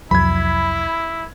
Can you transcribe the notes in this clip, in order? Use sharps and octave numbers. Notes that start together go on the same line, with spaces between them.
C2 F2 F#3 E4 B5 G#6